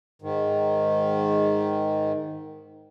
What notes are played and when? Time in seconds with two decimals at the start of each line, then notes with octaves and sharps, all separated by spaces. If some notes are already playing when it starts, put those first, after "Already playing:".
0.22 G#2 D#3